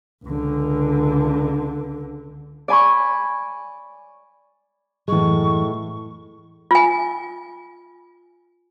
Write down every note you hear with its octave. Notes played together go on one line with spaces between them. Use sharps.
C#2 D3
D5 G#5 B5 C#6
F#2 A2 E3 G#3 C#6
F4 G#5